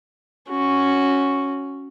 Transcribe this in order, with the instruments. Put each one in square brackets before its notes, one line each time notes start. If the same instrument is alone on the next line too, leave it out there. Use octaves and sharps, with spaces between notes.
[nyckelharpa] C#4 F#4